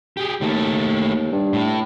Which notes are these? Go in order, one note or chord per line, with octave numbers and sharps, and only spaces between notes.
G4 G#4
D#2 D#3 A3
G2
A2